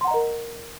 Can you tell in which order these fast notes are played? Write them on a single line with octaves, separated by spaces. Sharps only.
C6 F#5 A#5 D#5 A#4